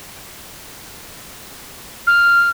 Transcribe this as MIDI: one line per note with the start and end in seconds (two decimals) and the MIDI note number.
2.07 2.49 89